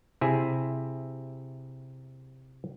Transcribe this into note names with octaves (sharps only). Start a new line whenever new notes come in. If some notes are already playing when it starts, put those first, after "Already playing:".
C3 E4 G#4 E5